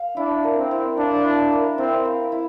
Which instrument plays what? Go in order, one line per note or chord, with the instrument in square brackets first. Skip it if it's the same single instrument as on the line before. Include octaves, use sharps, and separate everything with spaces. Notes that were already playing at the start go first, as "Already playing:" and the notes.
Already playing: [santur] F5
[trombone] D4 [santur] E4
[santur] A#4
[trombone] C4
[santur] E4
[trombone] D4 [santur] F5
[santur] E4
A#4
[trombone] C4 [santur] E4
[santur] F5
E4